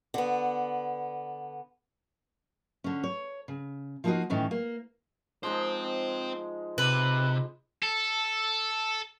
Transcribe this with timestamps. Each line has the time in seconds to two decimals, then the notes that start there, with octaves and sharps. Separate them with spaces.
0.14 D3 B3
2.84 D3 C#4
3.03 C#5
3.48 C#3
4.04 F3 A#3 D#4 E4 F#4 D#5
4.30 A2 D#3 E3 C#4
4.51 A#3
5.43 F3 G#3 C4 D#4 C5
6.78 C3 B4
7.83 A4